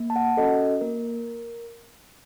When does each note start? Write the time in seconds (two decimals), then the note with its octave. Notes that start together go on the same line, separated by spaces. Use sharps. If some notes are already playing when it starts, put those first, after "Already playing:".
Already playing: A#3
0.10 A5
0.16 F#5
0.37 C#4 F#4 A4 D#5
0.81 A#3 A#4